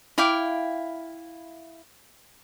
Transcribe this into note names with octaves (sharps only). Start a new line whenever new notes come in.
E4 F5 G5 D6